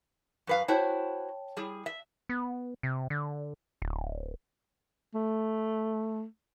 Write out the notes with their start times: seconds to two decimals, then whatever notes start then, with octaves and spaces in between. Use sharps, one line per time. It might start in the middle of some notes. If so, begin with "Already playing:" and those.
0.47 F#2 B4 F5
0.68 E4 F#4 C5 C#5 G5 A5
1.57 G3 E4 G#4
1.86 E5
2.29 B3
2.83 C3
3.10 D3
3.82 D1
5.15 A3